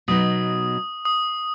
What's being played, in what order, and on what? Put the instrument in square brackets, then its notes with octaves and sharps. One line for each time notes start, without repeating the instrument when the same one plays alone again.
[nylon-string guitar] B2 F#3 B3 D#4 [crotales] D#6
[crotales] D#6